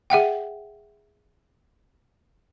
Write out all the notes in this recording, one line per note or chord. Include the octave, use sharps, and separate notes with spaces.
G#4 E5 F#5 G5